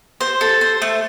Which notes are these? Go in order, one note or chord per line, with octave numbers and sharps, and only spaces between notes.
C5
A4
C5
A3